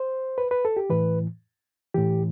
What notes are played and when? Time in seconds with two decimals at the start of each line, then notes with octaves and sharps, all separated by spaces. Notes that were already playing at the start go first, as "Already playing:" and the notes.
Already playing: C5
0.38 B4
0.51 B4
0.65 A4
0.77 G4
0.90 A2 E3 B4
1.94 A2 E3 G4